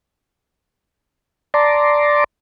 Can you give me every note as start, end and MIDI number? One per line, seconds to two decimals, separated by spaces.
1.54 2.24 74
1.54 2.24 81
1.54 2.24 82
1.54 2.24 84
1.54 2.24 86